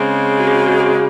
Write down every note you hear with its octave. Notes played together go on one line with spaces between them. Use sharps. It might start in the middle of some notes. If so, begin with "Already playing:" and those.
Already playing: C#3 G#3 C4 G#4
F#4
G#4
F#4
F#4
G#4
G#4